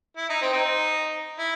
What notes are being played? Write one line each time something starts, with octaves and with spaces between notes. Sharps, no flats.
E4
D#4
C4
C4 D#4
E4